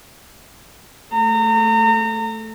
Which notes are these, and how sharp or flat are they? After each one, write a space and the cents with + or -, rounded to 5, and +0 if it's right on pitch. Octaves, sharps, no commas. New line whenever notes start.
A3 +0 A#5 -30